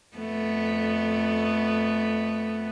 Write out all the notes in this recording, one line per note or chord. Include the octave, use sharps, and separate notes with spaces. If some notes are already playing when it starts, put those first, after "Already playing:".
F2 A3 B3